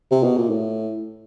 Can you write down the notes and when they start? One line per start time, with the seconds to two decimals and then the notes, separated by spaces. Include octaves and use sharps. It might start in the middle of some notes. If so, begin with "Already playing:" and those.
0.11 C3
0.24 B2
0.38 A#2
0.50 A2